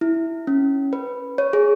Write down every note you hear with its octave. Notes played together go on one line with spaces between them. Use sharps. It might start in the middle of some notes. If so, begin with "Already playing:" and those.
E4
C#4
B4
C#5
G#4